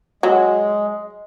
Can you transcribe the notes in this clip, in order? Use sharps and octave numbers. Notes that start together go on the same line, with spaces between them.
F#3 G#3